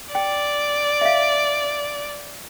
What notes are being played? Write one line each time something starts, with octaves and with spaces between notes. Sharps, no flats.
D5 G5
E5
F5